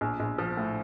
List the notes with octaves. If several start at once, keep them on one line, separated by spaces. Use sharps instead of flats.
A#1
A#1
F3
A2